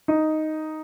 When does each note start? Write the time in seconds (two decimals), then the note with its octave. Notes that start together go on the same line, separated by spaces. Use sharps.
0.08 D#4